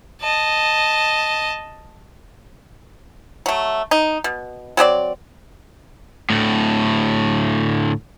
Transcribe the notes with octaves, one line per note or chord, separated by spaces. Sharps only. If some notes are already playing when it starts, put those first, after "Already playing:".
D#5 A5
F#3 A3
D#4
B2
F#3 C4 G#4 D5
D2 A2